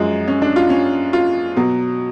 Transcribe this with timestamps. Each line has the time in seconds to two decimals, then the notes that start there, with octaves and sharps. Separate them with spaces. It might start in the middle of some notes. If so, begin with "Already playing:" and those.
Already playing: F#2 F3 G#3
0.28 C#4
0.42 D4
0.56 F4
0.70 C#4
1.13 F4
1.56 B2 F#3